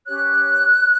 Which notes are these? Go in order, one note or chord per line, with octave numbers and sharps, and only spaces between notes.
C#4 G4 C#5 F#6